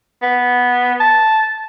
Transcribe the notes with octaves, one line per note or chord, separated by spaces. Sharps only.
B3
A5